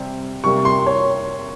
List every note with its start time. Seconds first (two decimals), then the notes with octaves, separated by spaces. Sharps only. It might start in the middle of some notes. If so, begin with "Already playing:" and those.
Already playing: C3 G3 C4
0.44 C3 G3 A#3 C#6
0.65 C6
0.86 C#5